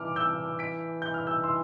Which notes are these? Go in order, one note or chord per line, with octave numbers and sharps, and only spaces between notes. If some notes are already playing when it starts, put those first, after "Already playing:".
Already playing: E3 D6 F6
E6 G6
B6 D7
G6
F6
E6 G6
C6 E6